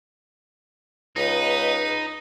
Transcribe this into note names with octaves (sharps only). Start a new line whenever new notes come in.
C#2 D#4 B4